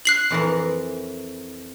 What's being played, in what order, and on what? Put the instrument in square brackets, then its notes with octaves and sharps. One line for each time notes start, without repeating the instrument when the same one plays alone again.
[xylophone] F#6 C7 F#7
[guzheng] F2 E3 A#4